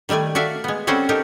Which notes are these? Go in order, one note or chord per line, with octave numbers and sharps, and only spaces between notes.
D#3 G3 A3 D5 G#5
F#4 A4 D5 E5 F5
G#3 B3
G3 C4 C#4 F#4 A4 C5
D#4 G4 A4 A#4